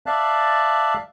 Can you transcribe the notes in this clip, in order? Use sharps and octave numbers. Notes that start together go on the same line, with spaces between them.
D5 E5 F5 A5 F#6